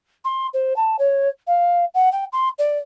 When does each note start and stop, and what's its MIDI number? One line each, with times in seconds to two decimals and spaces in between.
0.25 0.47 84
0.54 0.76 72
0.76 0.96 81
0.99 1.28 73
1.47 1.85 77
1.94 2.09 78
2.12 2.24 79
2.33 2.49 84
2.59 2.78 74